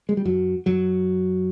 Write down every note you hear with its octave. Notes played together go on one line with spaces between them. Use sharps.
G#3
G3
F#2 F#3
F#2 F#3